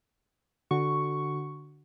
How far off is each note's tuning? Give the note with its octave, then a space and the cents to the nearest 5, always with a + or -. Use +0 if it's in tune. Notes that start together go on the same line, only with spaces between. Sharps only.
D3 +0 F#4 +0 C#6 +0